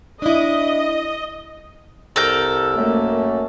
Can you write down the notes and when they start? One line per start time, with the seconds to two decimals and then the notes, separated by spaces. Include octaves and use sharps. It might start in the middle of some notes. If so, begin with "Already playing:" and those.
0.22 D4 E4 D#5
2.16 C2 A4 A#4 G6
2.78 F#2 A3 A#3